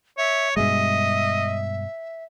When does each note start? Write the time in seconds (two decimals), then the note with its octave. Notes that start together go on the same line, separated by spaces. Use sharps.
0.18 C#5 E5
0.57 G2 B2 G#3 D#5 E5